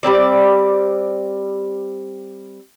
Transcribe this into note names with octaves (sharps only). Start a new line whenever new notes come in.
G3 A#3 C4 D5